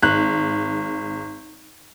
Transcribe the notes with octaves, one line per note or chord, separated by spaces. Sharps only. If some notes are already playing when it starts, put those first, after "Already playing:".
G#1 F#6